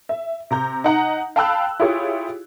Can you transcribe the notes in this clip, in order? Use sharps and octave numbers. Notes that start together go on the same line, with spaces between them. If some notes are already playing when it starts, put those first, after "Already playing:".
E5
C3 A#5 G6
D#4 F#5 A#5
F5 G5 A5 B5 E6 F#6
E4 F4 G4 G#4 C#5